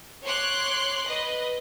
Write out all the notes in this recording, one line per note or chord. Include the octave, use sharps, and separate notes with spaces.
C#5 C6 D6 F#6
B4 D#5